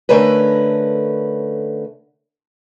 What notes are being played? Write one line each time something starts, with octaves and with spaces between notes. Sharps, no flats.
D3 A3 C#4 A#4 B4